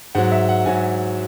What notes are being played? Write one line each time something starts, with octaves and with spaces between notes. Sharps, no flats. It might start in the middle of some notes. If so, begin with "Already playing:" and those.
G#2 F#3 F#5
E5
F#5
G#2 F#3 G#5